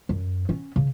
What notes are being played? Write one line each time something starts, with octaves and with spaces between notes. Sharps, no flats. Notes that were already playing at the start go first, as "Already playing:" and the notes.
F#2
B3 C#4
C#3